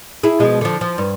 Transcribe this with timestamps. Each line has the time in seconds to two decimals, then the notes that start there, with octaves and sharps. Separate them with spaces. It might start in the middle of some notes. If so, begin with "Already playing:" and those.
0.23 E4 G#4
0.40 B2 F3 G#3
0.61 D3 F3
0.81 F3
0.98 G2